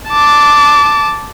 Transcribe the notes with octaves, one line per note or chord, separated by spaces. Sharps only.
A5 D6